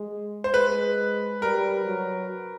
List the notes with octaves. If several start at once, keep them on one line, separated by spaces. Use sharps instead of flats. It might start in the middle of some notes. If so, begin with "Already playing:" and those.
Already playing: G#3
C5
G#3 B4
G3 A#4
F#3